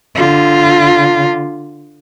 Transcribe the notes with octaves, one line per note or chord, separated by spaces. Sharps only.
D3 F4